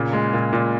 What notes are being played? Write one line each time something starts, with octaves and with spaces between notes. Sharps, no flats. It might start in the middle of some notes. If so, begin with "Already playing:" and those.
Already playing: A#2 C#3
G#3
A#2
A#2